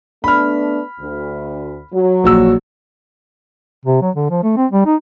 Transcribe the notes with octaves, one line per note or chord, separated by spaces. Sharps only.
A3 B3 D4 B5 F6
D2
F#3
A#1 F#4 E6
C3
F#3
D3
F3
A3
C4
G3
D#4